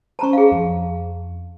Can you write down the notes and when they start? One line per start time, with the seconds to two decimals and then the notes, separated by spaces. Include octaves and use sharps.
0.19 C#4 C5 A5 A#5 C#6
0.33 G#4 F5
0.52 F2